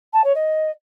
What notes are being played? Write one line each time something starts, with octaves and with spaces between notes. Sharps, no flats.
A5
C#5
D#5